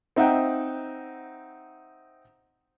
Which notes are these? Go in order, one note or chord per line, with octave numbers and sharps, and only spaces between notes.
C4 D#4 E5 F#5 G5